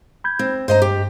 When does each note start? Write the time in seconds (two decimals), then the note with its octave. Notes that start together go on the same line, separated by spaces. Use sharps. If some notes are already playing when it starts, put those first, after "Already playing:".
0.24 B5 G6 G#6
0.39 C4
0.68 G2 C5 D#5 A#5
0.82 G4